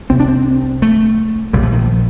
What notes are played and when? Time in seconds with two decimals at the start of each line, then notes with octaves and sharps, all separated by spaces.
0.10 C2 C3 C4
0.20 D4
0.28 C4
0.82 A3
1.53 A#1 A#2 G3
1.62 F3
1.72 D#3
1.83 F3